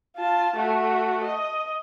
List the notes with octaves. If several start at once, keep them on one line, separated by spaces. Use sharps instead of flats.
F4 A5
A3 F#4
D#5